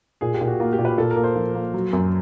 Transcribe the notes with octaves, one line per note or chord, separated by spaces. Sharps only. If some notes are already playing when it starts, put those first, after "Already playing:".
A#2 G#4
G4
A#2
F#4
A#3 F4
G4
A#2
B4
A#2 A4
A#4
A#3
C5
F3
A#3
F#3
F#2